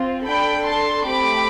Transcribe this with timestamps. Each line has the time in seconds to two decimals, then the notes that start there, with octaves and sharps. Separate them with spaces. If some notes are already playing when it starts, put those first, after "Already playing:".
Already playing: C4 F4
0.25 D4 A4 G5 B5
0.65 A5 C6
1.05 A3 C4 G4 B5 D6